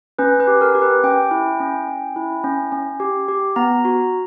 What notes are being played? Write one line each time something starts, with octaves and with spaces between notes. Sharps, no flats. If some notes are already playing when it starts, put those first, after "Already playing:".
C#4 B4
B4
G4
A#4
G4
B4
C#4 G5
E4
C#4
C#4
E4
C#4
C#4
G4
G4
B3 A#5
F#4